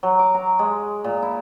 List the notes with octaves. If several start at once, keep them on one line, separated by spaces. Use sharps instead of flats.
F#3
D6
A#5
G#3
A#2
E4